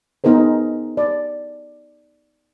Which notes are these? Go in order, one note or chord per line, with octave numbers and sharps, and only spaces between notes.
B3 D#4 G#4 A#4 C5
D5